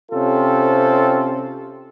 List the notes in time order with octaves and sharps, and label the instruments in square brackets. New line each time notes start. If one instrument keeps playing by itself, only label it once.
[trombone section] C3 C4 C#4 F4 A4